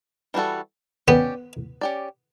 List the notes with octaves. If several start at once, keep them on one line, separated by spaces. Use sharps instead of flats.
E3 G3 D4 F#4 A4
B3 C#4 G4 D5
C#4 G4 D5